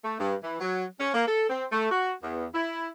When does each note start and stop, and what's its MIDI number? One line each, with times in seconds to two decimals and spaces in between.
0.05 0.17 57
0.19 0.34 43
0.43 0.57 52
0.60 0.84 54
0.99 1.12 61
1.13 1.23 58
1.27 1.48 69
1.49 1.65 60
1.71 1.91 57
1.91 2.13 66
2.22 2.46 40
2.54 2.88 64